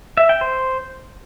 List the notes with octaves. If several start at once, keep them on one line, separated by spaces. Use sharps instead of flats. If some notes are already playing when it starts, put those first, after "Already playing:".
E5
G5
C5